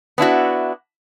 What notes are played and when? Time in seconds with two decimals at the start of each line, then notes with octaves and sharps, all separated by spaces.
0.18 B3 D4 E4 F#4